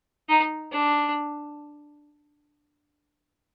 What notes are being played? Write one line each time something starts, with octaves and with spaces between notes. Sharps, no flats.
D#4
D4